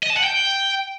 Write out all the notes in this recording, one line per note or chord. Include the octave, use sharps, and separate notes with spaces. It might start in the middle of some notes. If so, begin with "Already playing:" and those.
D#5
A5
F#5
G5